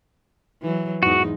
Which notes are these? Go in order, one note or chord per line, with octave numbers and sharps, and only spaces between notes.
E3 F#3
E2 G#2 D#4 F#4